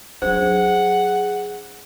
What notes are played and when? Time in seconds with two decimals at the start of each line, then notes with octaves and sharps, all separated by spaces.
0.22 F#3 D4 G#4 C5 F#5